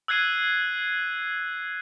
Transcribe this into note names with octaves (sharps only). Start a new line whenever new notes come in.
E6 F#6 G#6 C7 D#7